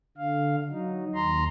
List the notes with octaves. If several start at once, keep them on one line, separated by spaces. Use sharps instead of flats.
D3 F5
F#3 D#4
D#2 A#5 C6